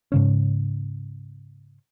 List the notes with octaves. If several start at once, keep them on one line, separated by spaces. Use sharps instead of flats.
G#2 C#3 C#4